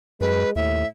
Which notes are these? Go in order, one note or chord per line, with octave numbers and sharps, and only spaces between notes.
F#2 G#3 B4
D#2 A2 E5